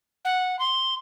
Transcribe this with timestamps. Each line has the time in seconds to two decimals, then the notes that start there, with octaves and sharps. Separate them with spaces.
0.25 F#5
0.59 C6